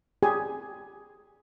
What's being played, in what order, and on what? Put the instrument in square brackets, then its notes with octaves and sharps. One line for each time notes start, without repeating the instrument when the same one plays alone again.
[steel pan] G4 G#4 G#5